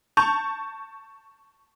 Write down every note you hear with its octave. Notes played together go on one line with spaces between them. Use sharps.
A5 C#6 G6 F7